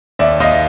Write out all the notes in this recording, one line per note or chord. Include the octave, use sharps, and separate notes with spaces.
D#2 D5 E5
D#2 D#5 F5